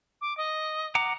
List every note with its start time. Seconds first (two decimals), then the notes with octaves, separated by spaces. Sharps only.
0.21 D6
0.38 D#5
0.95 F#5 A#5 D6